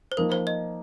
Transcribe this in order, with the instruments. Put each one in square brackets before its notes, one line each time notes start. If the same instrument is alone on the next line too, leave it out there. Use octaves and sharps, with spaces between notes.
[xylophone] C5
[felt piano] F3 A#3 D#4 [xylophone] A#4
[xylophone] C5
D#5